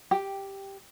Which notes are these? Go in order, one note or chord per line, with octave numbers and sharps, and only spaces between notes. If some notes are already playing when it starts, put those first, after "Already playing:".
G4